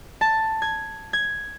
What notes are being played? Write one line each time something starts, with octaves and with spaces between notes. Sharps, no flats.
A5
G#6
G#6